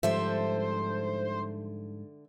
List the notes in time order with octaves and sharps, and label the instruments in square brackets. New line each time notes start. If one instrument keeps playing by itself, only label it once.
[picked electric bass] G#2 F3 G3 [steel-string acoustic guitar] D3 A4 E5 [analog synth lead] C5